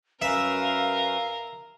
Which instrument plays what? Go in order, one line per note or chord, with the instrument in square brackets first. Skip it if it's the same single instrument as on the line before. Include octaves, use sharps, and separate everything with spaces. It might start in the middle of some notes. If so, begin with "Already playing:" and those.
[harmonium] F#2 C#4 B4 [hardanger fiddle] A#4 [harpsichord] E5 [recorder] F5